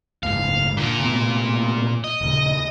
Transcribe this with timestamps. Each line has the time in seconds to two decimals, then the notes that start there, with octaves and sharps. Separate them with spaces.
0.23 F#1 C#2 G#2 F5
0.77 A#2 D3 F4
1.00 A2 C3 B3
2.04 D#5
2.21 D#1 C#3